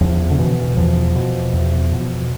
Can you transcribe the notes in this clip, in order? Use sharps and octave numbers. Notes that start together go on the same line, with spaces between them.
E2 F3
D3
B2 E3
E2 F3
B2
E2
B2